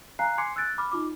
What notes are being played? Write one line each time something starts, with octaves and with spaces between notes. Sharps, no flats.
F5 G#5 A#5 F#6 C7
G#5 C6 D6 G#6 C7 C#7
E6 F#6 G#6 A6 D7
B5 D6 F6
D#4 F4 D6